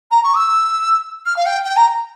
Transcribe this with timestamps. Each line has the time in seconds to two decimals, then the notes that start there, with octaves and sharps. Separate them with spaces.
0.11 A#5
0.23 C#6
0.36 E6
1.25 F6
1.36 F5
1.46 G5
1.64 G5
1.76 A#5